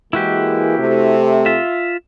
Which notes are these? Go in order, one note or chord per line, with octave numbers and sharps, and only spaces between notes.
E3 G#3 A#3 E4 F#4 G4
C3 A3
F4 E5